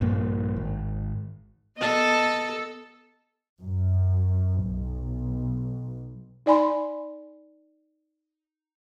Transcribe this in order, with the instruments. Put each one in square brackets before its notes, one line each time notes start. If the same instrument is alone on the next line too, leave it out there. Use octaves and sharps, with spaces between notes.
[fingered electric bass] A#1 G2 A#3
G#1
[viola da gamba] B3 A4 [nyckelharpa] D#5 A5
[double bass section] F#2
B1
[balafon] D#4 D5 G#5 B5 C6